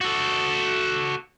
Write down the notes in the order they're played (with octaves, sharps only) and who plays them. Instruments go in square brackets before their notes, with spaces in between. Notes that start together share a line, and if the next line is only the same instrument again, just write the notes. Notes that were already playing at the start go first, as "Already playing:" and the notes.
[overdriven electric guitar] F#4 A4